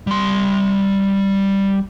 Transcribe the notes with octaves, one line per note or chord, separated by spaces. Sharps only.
G3 C6